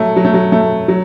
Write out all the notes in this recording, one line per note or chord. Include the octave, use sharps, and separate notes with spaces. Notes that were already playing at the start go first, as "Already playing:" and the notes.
Already playing: F#3 A3
F#3
A3
F#3
A3
F#3